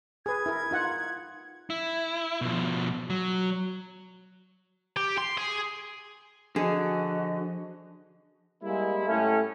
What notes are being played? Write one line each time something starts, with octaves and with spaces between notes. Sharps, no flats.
G#4 B4 G#6
E4 A#4
D#4 F4 F#5
E4
B2 F3
F#3
G4
C6
G#4
D3 F3 F#4 G#4 D#5
G3 G#3 A#3 E4
A2 A3 C#4